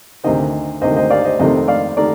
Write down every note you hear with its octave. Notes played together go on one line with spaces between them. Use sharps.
D2 C3 D#3 C5 D#5
D2 C3 D#3 C5 D#5
C5 D#5
D5 F5
C5 D#5
F2 C3 D#3 A3 C5 D#5
D5 F5
D#3 A3 A#4 D5